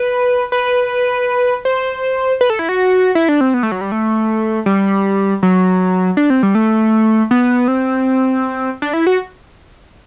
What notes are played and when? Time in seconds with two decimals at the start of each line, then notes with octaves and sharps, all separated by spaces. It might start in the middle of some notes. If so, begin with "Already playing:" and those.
Already playing: B4
0.52 B4
1.65 C5
2.41 B4
2.50 A4
2.59 E4
2.69 F#4
3.15 E4
3.29 D4
3.41 C4
3.54 B3
3.63 A3
3.72 F#3
3.81 G3
3.92 A3
4.66 G3
5.43 F#3
6.17 D4
6.30 C4
6.43 G3
6.55 A3
7.31 B3
7.68 C4
8.82 D4
8.93 E4
9.07 F#4